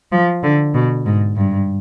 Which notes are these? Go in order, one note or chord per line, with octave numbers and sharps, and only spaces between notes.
F3
D3
B2
G#2
G2